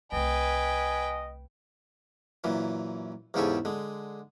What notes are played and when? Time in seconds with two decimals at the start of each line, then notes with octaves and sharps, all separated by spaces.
0.12 C2 A3 B4 D#5 G5 G#5
2.44 F#2 A#2 E3
3.34 E2 G#2 C#3 G4 A4 G#5
3.65 D3 G#3